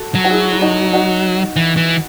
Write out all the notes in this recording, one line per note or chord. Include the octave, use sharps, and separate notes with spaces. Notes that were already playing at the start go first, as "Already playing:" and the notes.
Already playing: F#4 A4
F#3
F#4
E4 G#4
E4
D#4 F#4
D#4 F#4
E3
E3